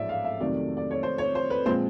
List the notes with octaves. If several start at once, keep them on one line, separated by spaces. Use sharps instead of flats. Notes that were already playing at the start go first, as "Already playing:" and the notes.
Already playing: A1 G#2 F3 D5 E5
F5
E5
F2 C3 D#3 F#3 A3 D5
D5
C#5
C5
C#5
C5
B4
A#2 F3 G#3 C4 C5